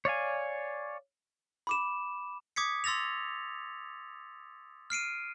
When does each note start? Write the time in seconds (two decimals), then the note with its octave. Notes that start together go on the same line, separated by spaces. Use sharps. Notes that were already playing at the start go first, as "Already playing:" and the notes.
0.05 C#5 D5 F5 G#5
1.67 B5 D6 E7
2.56 D6 D#6 G#6 B6 C#7
2.84 C6 E6 A6 A#6 F7
4.90 F6 C7 D7 D#7